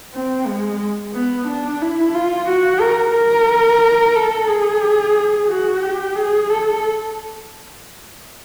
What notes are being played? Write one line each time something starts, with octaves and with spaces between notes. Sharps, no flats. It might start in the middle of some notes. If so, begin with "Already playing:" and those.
C4
G#3
B3
D4
E4
F4
F#4
A#4
A#4
A4
G#4
F#4
G4
G#4
A4